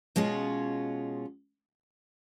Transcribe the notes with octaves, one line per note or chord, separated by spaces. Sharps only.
B2 G#3 C#4 F4